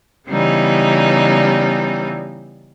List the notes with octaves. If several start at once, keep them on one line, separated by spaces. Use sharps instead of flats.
C#3 E3 G3 B3 C#4 D#4